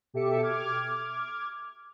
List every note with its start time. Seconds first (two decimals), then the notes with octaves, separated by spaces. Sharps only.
0.13 B2 G4 A4 E5 D6 C#7
0.42 D6 F6 G#6